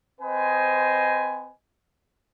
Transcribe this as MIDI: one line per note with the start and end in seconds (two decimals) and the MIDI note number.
0.20 1.52 60
0.20 1.52 71
0.20 1.52 72
0.20 1.52 75
0.20 1.52 80